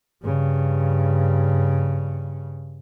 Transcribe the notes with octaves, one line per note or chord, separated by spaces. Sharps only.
G2 C#3